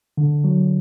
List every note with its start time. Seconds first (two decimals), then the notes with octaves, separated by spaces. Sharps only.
0.17 D3
0.44 F#3